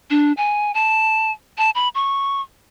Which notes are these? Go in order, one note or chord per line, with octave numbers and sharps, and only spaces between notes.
D4
G#5
A5
A5
B5
C#6